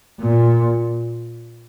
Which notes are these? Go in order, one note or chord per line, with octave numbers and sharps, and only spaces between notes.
A#2